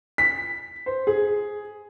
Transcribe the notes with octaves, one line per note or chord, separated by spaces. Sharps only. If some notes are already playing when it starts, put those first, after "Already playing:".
B6
C5
G#4